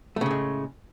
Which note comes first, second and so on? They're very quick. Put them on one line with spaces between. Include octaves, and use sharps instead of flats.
A3 C#3 A2 G#3